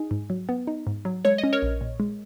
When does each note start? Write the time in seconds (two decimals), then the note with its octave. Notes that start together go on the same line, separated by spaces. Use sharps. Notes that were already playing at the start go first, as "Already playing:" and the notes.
Already playing: D#4 G#4
0.11 G#2
0.30 F#3
0.49 B3
0.67 D#4
0.87 G#2
1.05 F#3
1.25 G#3 C#5
1.38 D#5
1.44 C#4
1.53 A#4 C#5
1.62 A#1
1.81 A#2
2.00 G#3